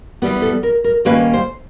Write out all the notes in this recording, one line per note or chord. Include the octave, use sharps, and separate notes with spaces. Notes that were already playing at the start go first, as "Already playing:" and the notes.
E3 G3 B3
A4
A#4
A#4
D#3 G3 A#3 C#4 B4
C5